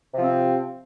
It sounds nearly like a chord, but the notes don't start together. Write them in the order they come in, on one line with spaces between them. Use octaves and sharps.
C3 F3 C4